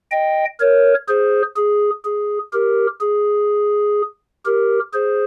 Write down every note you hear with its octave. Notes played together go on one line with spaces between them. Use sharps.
D#5 G5
A#4 C#5
G#4 C5
G#4
G#4
G4 A#4
G#4
G4 A#4
G#4 C5